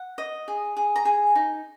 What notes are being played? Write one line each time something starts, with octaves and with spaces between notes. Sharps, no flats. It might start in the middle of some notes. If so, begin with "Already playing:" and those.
Already playing: F#5
D#5
G#4
G#4
A#5
G#4 G#5
D#4